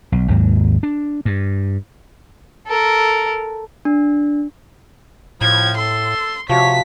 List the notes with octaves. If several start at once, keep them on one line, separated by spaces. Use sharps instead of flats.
B1
G#1 D#2 G#2 F#3
D4
G2
A4 A#4
D4
A2 F3 G#6
A4 C6
C3 F3 F#4 C#5 E5 B6